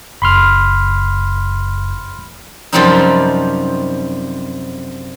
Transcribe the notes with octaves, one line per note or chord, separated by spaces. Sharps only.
F#1 B5 C6 F6
F#2 C3 F3 G3 C4 D#4